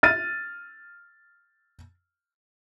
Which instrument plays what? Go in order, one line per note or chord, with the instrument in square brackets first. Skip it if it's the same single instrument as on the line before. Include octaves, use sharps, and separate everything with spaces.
[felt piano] F6 A6 D#7